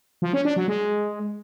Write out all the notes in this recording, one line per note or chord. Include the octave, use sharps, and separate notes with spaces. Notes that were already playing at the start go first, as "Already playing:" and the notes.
F3
C#4
D4
F#3
G#3